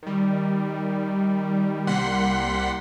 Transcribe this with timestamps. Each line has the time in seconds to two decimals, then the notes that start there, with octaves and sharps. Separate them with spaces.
0.03 D#3 G3
1.87 C2 G3 A#3 F#5 C6 B6